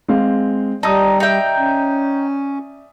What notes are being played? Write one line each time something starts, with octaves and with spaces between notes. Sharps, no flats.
G#3 C4 F5
G3 D#4 A5 D#6
D#4 D5 E5 G5
C#4